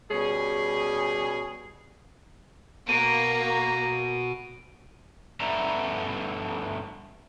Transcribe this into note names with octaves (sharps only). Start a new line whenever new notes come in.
B2 G3 C#4 G#4
B2 A#3 B3 A#5 D7 D#7
G2 A3 B3 D5 E5 A#5